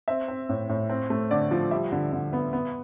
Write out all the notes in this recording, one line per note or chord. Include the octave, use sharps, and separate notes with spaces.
C4 E5
C4
A2
A2
C4
A3
D3 D5
F3
G3 E5
D3
D3
B3
B3